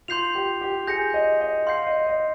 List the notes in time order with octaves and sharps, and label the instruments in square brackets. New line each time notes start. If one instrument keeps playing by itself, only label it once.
[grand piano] F4 [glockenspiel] C6 G6 C7 F7
[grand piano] G4
G4
[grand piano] G#4 [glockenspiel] G6 A#6 C#7
[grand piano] D#5
D#5
[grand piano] F5 [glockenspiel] C6 G6 C7
[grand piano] D#5
D#5